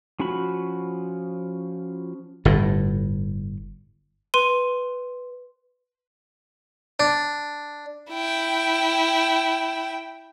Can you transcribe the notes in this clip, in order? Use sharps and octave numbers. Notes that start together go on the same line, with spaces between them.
F3 C#4 F4 F#4 B5
G1 A2
B4 C6 D#7
D4
E4 G5